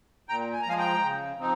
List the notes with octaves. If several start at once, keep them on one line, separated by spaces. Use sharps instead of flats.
A#2 G5 A#5
G#5
A#5
F3 G#3 F5 G#5
G5 A#5
C#3
F3 C4 D#4